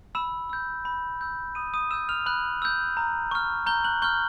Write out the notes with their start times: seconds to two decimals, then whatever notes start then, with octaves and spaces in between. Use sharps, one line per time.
0.15 B5 E6 E7
0.50 E6 G6
0.85 B5
1.21 E6 G6
1.55 B5 D#6 D#7
1.74 D#6 D#7
1.91 E6 E7
1.93 G6
2.09 F6 F7
2.26 B5 F#6 F#7
2.62 E6 G6
2.97 A#5
3.31 C#6 F6
3.67 A#5 G6 G7
3.84 F#6 F#7
4.02 C#6 F6 G6 G7